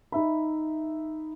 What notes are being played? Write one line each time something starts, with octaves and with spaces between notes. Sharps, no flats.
D#4 E5 B5